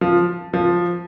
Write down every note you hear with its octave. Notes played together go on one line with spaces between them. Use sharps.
F3
F3